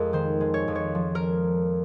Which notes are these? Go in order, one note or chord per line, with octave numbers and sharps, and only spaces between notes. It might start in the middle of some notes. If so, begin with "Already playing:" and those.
Already playing: F2 G#3 G#4 A#4
D#3 C5
G#3
C#5
F2
C#5
F3
A#4